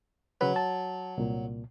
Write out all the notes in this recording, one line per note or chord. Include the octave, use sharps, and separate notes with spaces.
C#3 F#3 B4
A5
C2 A#2